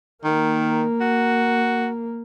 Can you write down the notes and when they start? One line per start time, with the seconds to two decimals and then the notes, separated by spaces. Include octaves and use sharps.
0.24 D#3 A#3
1.01 F#4